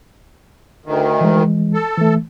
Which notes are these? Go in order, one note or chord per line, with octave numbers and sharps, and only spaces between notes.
D2 D#3
E3 G#3
A4
E3 A3